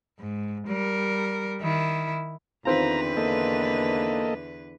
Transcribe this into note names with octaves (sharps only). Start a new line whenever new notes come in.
G#2
G3 A#4
D#3 E4
E2 D3 D#3 C4 F4 B4 A#5
A#3 A4 D#5